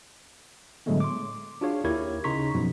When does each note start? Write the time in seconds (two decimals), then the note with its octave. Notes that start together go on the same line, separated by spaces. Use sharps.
0.86 A2 D3 F#3 G#3 A3 B3
1.00 C6 D6
1.61 D4 F4 F#4 G#4 C#5 F5
1.84 D#2 E4 G4 A#4 C#5 G#6
2.24 C#3 D#4 A#5 C6 C#6 B6
2.54 F#2 B2 F3